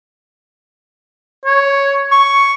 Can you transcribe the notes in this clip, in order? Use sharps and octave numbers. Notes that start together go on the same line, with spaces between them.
C#5
C#6